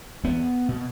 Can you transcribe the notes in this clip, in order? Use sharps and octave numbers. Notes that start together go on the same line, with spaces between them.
E2 B3
B2